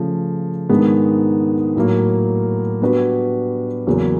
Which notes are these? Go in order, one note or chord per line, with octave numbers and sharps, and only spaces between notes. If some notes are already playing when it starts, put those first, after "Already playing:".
Already playing: C#3 F3 A3
G#2 D#3 G#3 B3 D4
A2 F#3 A#3
G3 B3 D4 F#4 B4
E2 C#3 F#3 A#3 C#4